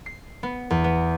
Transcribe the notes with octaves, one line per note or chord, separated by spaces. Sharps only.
C7
B3
E2
B3